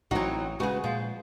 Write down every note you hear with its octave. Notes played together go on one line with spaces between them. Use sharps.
A1 F#3 C4 D#4 E4 F#4
C#3 G#3 F#4 G#4 B4
A#2 F3 G#3 F5